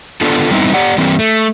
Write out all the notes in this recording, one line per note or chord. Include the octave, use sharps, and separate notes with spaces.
B3 D4 F4 A4
F#3 G3 B3 C4 D#4 E4
G4 D5 F#5
E3 G3 A#3 C4
A3